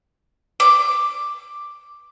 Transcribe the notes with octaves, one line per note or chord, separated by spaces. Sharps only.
D6